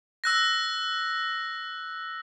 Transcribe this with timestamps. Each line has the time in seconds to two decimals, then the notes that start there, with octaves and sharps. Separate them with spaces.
0.24 E6 F#6 A#6